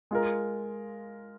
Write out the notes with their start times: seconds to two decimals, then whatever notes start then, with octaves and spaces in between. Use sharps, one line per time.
0.11 G#3 F4 A#4